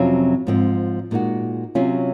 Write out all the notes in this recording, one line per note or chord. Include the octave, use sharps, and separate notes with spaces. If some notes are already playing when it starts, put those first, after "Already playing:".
Already playing: F2 C3 F#3 C#4 F4
G#2 F3 C4
A#2 G#3 D#4 F#4
C3 F#3 C#4 F4